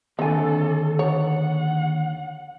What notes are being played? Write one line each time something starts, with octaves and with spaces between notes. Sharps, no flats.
D#2 D3 C4 A4 G#5
C#5 F#5